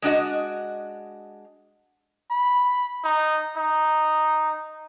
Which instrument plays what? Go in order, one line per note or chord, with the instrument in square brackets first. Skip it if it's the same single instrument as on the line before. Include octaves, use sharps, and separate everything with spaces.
[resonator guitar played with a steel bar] G#3 D4 F#4 D#5
[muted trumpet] B5
D#4
D#4